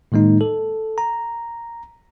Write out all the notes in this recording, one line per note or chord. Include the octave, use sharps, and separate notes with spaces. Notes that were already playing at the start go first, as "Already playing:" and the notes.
A2 D#3 G#3 A#3 D#4
A4
A#5